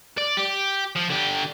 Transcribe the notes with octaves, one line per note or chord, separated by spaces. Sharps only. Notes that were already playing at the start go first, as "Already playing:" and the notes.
D5
G4
F3
D3 G4